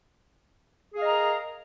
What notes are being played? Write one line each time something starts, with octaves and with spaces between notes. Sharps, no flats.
G#4 A#4 D#5 F5 A#5